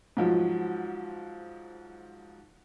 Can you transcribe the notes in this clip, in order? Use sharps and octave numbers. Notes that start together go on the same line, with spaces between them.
G#2 F3 F#3